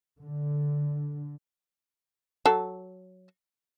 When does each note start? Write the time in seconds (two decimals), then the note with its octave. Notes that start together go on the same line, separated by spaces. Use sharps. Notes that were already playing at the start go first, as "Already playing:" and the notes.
0.21 D3
2.46 F#3 A4